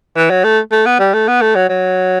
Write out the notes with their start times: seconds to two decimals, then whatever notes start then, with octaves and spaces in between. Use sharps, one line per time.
0.16 E3
0.30 F#3
0.44 A3
0.72 A3
0.86 B3
0.99 G3
1.14 A3
1.28 B3
1.41 A3
1.55 F#3
1.69 F#3